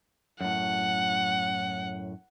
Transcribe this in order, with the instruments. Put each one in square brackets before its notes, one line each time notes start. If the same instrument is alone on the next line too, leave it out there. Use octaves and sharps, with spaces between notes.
[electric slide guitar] F#2 A2 [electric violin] F#5